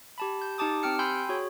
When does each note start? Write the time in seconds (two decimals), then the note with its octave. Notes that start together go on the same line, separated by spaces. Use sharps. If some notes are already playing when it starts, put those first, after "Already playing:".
0.18 G4 A5 B5
0.42 G6
0.58 D#4 G4 A5 D6 D#6
0.83 C4 G4 G5 F6 C#7
0.99 G5 G#5 B5 C6 E6 G6
1.29 F#4 G#4 C#5